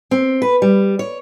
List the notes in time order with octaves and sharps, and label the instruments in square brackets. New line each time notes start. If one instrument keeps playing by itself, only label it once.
[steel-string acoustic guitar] C4
B4
G3
C#5